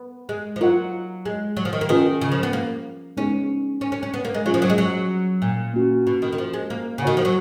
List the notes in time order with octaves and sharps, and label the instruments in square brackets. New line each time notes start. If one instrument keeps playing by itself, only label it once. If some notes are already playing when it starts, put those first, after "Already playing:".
Already playing: [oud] B3
G#3
F3
[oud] F#3 [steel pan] F4 A#4 D#5 F#5
[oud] G#3
F#3
F3
D#3
A#3
[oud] D#3 [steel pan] C#4 F4 G#4 B4
[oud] C#3
F3
B3
A#3
[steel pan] G#3 B3 D#4 G#4 [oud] C#4
[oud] C#4
C#4
C#4
B3
A#3
G#3
[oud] F#3 [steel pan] C#4 F4 G#4 C#5 F5
[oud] F3
F#3
G#3
F#3
A#2
[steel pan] A#3 C#4 F#4
[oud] B2
D#3
D#3
F3
G#3
A#3
C#3
[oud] D#3 [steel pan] F#4 C#5 F#5
[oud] F3
F#3